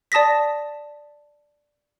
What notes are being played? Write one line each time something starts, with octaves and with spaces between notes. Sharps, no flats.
D5 A5 D#6 A#6 B6